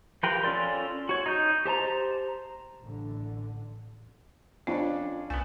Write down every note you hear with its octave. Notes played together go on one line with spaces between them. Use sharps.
F3 G4 A#4 B4 G5
C#4 F4 A4 D5 C6
F#4 C#5
D#4 G6
G4 C5 A5 A#5
A1 D3
F2 C#4 D4 F4
C2 A3 B3 G#5